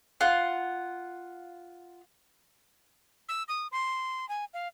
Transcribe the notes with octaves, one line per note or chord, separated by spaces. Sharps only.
F4 F#5
E6
D#6
C6
G#5
F5